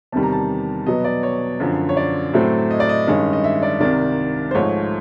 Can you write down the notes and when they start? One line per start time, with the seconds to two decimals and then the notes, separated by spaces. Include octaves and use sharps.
0.12 E2 C3 D#3 G3 A5
0.23 A#5
0.32 A5
0.86 B2 F#3 B3 D#5
1.04 D5
1.23 C#5
1.60 F#2 D3 F3
1.89 C#5
1.97 D5
2.34 A2 F#3 A3 C4
2.71 D#5
2.80 D5
2.89 D#5
3.07 G2 D#3 G#3 C#4
3.33 D#5
3.44 E5
3.63 D5
3.81 C2 C3 D#3 D5
4.51 C5
4.55 G#2 F3 A3 C#5